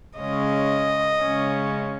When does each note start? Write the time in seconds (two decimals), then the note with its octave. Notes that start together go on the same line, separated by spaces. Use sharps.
0.18 C#3 G#3 C#4 D#5
1.22 C#3 G#3 C#4